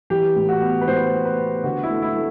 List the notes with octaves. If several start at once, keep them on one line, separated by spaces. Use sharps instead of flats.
E3 G4
A2
F#4
B3
B4
A2 C5
B3
B4
B3
D3 F#4
E4
A3
E4
A3